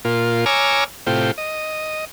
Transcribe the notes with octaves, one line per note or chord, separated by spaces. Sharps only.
A#2 F4
C#5 G#5 A#5 D6 E6 F6
A2 C3 F4 G5
D#5